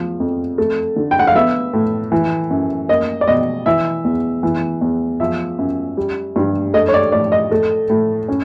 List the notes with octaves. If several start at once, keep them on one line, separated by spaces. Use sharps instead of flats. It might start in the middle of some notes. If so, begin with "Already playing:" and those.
Already playing: E2 F3
F2
A3
D3
G5
F#5
F5
B3 E5
A2
E3
F#2
A#3 D#5
D5
B2 D#5
E3 E5
E2
E3
E2
F3 E5
F#2
G3
G2
A3 D#5
C#5
D5
A2 D5
D#5
A3
A2
C#4